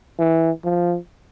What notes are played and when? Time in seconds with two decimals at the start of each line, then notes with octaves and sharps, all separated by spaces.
0.19 E3
0.64 F3